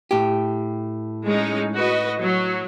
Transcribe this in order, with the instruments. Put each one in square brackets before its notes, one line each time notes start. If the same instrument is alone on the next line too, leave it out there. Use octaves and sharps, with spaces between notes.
[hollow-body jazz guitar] A2 G4
[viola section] G#3 C#4 D#4
F#4 B4 D#5
F#3